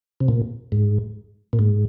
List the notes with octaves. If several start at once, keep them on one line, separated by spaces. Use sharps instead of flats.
C3
A#2
G#2
A#2
G#2